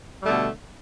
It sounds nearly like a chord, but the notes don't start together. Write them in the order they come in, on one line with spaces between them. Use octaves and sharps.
G3 A3 D3 B2